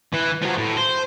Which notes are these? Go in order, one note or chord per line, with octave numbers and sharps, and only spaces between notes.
E3
F3 F#3
A2
C5